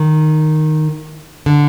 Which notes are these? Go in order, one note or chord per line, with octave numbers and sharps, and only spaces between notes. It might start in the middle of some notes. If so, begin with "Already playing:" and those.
Already playing: D#3
D3